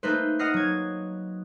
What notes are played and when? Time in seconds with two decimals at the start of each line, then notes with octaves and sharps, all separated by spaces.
0.03 A3 A#3 D#4 B4 C5
0.39 D#5 F#5 D#6 F6 A#6 C7
0.54 F#3 G#6